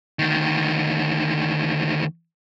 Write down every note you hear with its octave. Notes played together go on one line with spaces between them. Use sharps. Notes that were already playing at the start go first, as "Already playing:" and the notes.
D2 D#3